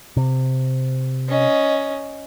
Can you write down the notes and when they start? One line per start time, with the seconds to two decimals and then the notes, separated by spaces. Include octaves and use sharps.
0.17 C3
1.29 C#4 D#5